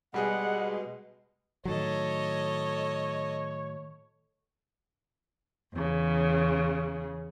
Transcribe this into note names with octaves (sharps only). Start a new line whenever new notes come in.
B2 G3 G#3 G#4 D#5 F#5
A2 D#3 F#3 A4 C#5 D#5
E2 C#3